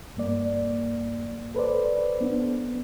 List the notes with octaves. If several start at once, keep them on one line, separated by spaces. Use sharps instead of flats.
G2 A#3 D5
A4 B4 C5 D5
B3 D4